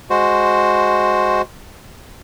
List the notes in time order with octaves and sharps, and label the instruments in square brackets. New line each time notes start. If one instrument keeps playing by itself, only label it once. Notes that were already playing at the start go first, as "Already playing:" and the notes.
[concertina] G#3 F#4 C5